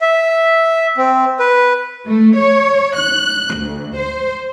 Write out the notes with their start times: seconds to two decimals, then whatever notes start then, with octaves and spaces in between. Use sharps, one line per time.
0.01 E5
0.97 C4
1.39 B4
2.08 A3
2.38 C#5
2.97 F#6
3.56 D2
3.97 C5